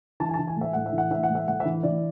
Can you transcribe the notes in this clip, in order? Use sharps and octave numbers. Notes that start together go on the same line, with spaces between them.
E3 A5
G#5
A5
E3
G#5
A2
E5
A2 F#5
E5
E3
F#5
E3 E5
F#5
A2
E5
A2 F#5
E5
E3
E3 D5